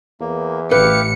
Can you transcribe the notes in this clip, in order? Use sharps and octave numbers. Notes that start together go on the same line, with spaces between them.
E2 A#3
A1 E4 G4 B4 F5 C#7